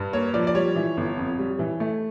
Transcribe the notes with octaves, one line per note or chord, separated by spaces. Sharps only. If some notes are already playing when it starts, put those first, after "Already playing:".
Already playing: G2
A#3 C#5
F3 D5
D5
G3 C#5
E3
G1
F2
G3
E3
A3